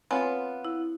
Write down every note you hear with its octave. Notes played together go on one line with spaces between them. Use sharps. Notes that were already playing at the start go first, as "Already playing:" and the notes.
B3 C4 F4 C#5 G#5
E4